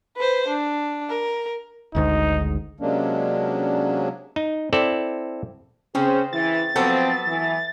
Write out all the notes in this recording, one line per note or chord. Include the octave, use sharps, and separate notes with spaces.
B4 C5
D4
A#4
G#1 D2 G#2 D#4
C3 F#3 G#3 A#3 C#4 D4
D#4
C4 E4 A4 D5
C#3 C4 C#4 G#4 C5
E3 A6
F3 F#3 B3 C4 A4
E3